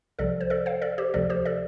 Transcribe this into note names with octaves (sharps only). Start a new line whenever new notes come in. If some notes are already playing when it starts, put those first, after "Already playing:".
C2 C3 F3 A4 D5
C5
A4 D5
C5 F5
A4 D5
G4 C5
D2 C3 F3 A4 D5
G4 C5
A4 D5